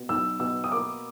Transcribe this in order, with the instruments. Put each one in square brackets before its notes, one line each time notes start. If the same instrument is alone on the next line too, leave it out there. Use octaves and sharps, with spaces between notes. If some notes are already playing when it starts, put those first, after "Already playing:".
Already playing: [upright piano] B2
B1 E6
B2 E6
D#6
A#3 D6